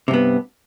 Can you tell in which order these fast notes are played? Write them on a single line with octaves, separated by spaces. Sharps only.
C3 G2 B3